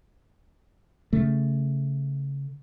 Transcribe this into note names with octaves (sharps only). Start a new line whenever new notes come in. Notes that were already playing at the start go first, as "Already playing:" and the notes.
C#3 A3